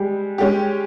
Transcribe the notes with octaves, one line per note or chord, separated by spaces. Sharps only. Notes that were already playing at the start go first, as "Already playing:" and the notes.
Already playing: G3 G#3
G#3 C#4 G4